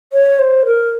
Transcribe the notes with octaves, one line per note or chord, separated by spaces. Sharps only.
C#5
C5
A#4